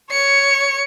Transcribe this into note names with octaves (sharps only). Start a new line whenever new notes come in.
C#5 C#7